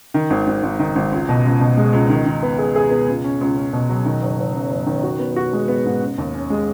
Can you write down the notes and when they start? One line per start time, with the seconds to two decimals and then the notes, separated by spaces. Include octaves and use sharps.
0.14 D#3
0.30 G#1
0.47 G#1
0.63 G#1
0.79 D#3
0.96 G#1
1.12 C#2
1.29 B2
1.45 C#2
1.61 B2
1.77 G#3
1.93 C#2
2.09 D#3
2.26 D#3
2.43 B3
2.58 G#4
2.76 G#4
2.91 B3
3.08 C#2
3.24 C#4
3.41 C#2
3.57 C#4
3.73 B2
3.89 F#3
4.05 D#3
4.21 F#1
4.38 F#1
4.54 F#2
4.71 F#1
4.86 D#3
5.03 F#4
5.19 B3
5.36 F#4
5.53 G#3
5.68 B3
5.85 G#2
6.01 C#3
6.18 D#2
6.34 C#4
6.50 G#3